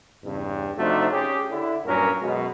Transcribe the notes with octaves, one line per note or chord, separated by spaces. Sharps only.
E2 G2 C#3
C3 F3 A3 D4 D#4 F#4
C#4 G4 G#4
D3 E4
G2 A#2 F#3 C#4 A#4
F#2 B2 G#3